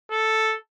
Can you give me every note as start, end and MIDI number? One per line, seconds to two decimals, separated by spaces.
0.11 0.55 69